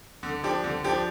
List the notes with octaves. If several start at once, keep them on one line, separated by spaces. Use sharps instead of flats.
D3
F3 D4 G4
D3
F3 D4 G4